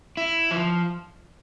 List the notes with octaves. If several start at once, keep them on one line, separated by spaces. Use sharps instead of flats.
E4
F3